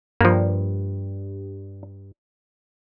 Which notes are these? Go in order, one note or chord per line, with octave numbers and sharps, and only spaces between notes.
G2 F3 A#3